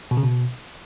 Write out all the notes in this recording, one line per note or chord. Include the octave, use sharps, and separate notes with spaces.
B2
C#3
B2